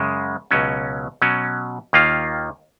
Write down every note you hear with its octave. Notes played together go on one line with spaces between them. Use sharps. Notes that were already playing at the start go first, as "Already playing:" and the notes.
Already playing: F#2 C#3 G#3
C#2 B2 F#3 C#4
B2 F#3 C#4
D#2 D#3 A#3 F4